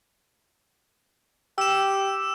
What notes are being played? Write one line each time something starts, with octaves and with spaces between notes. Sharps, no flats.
G4 E6 E7